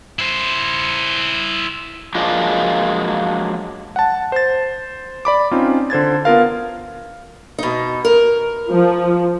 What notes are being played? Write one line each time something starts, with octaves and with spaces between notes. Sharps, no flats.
E4 C5
F3 F#3 G#3 A#3 D4 F4
F#5 A5
C5 A6
D5 B5 D6
C4 C#4 D#4 F4
D3 C5 G#6 A6
B3 F4 A#4 F5
B2 D#4
A#4
F3